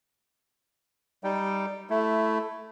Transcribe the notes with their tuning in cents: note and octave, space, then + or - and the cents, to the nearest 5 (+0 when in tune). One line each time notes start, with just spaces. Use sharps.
G3 +0 D#4 +0 G5 +0
A3 +0 E4 +10